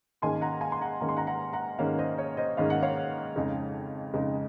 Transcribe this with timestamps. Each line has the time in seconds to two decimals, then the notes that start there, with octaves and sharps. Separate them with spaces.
0.22 G#2 D#3 A#3 C#4 G#5 C6
0.41 F#5 A#5
0.61 F5 G#5
0.72 C6
0.81 F#5 A#5
1.00 G#2 D#3 A#3 C#4 A#5
1.09 C6
1.17 F#5 A#5
1.27 F#5 A#5
1.53 F#5 A#5
1.79 G#2 D#3 A#3 C#4 C#5 F5
1.98 C5 D#5
2.18 C#5
2.37 C5 D#5
2.57 G#2 D#3 A#3 C#4 F5
2.70 F#5
2.83 C#5 F5
3.36 F2 C#3 G#3 D#4
4.14 F2 C#3 G#3 D#4